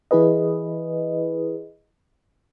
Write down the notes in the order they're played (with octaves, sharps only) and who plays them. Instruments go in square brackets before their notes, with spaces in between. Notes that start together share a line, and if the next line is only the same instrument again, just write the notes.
[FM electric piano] E3 E4 G#4 B4 D#5